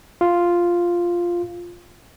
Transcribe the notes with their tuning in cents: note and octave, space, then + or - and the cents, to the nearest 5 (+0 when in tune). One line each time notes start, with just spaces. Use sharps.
F4 +0